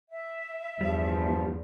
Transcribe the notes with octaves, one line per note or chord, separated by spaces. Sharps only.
E5
E2 G2 B2 F3 G3